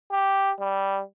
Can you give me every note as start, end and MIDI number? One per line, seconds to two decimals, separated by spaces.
0.12 0.51 67
0.60 1.01 55